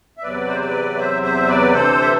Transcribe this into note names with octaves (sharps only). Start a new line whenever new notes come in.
E5
E2 C3 F#3 B4 D5
C5
B4 D5
C5 E5
C5 E5
B4 D5
D2 C3 E3 A4 C5
E5